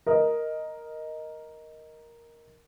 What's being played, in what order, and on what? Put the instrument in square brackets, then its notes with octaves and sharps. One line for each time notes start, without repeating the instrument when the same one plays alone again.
[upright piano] A#4 D#5